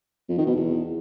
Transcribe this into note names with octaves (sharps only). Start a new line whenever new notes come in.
F2
D#3
B2
E2